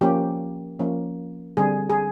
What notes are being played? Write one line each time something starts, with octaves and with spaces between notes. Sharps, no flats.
F3 A#3 C#4 G4
F3 A#3 C#4
D3 G3 C4 G#4
G#4